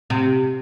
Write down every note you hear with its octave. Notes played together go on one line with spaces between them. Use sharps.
C3